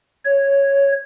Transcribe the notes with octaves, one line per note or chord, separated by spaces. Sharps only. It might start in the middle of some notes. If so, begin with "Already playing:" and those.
C#5